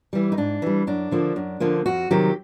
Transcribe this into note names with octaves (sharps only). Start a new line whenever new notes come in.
E3 G3
D#4
G#2 D4
E3 G3
F#2 D4
D3 F3 A#3
F#2
D3 F3 A#3
F2 F#4
C3 D#3 F#3 G4